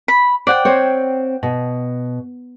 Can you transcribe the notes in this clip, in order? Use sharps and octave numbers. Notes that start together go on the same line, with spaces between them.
B5
C5 D5 F#5 G5
C4 C5 C#5
B2